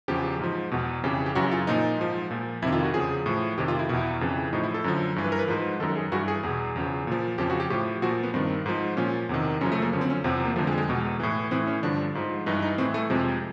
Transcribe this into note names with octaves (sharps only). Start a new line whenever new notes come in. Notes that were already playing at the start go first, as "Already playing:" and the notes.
E2 C#3 F3 G4
G#2 F3
E2 B2
F2 C#3 E3 G4
G4
F#2 C#3 E3 F#4
F4
A#2 F3 D#4
G#2 F3
A#2 F3
F2 C3 D#3 E4
F4
F#4
E2 C#3 F3 G#4
A2 F3
F2 C3 D#3 G4
F4
E4
E2 B2 E4
F2 C#3 E3
A2 F3 D#4
E4
A4
F#2 D3 F3
G2 E3
B4
A#4
B4
G#2 F3
F#2 D#3 A4
G#4
G2 E3 F#4
G#4
E2 B2 G#4
E2 C#3 F3
A#2 F3
F2 C#3 F3 G4
F#4
G4
A2 F3 G4
A#2 F3 F#4
B3
G2 D#3 C4
G#2 F3
A#2 F3 C#4
E2 C3 D#3
F#2 C#3 F3 C#4
A3
A#3
F#2 D3 F3 C#4
C4
C#4
E2 C3 F3 C4
A#3
F2 D3 F3 A3
G#3
G#3
E2 B2
A2 E3
A2 E3 C4
C#4
G2 D3 F3 D4
G#2 F3
G2 E3 D#4
D#4
A2 E3 C4
A3
F2 C3 F3 G#3